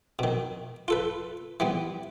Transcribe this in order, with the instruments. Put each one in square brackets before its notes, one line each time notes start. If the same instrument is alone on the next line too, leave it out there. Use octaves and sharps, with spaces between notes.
[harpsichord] B2 D#3
F4 A4 B4
E3 G3 B3